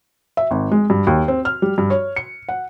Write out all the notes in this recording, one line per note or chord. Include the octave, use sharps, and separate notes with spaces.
E5
G#1
G#3
G2
D#2
C4
F6
G3
G2
C#5
C#7
F#5